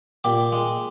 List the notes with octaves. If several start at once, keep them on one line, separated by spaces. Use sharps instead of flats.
A#2 G4
G#3